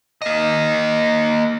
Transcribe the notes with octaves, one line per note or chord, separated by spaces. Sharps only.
A#3 D#5